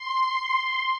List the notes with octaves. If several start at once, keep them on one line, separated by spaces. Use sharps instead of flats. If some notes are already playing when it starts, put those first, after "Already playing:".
Already playing: C6